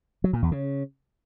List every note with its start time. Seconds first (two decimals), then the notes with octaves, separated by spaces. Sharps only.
0.24 F#3
0.33 A#2
0.42 E2
0.52 C#3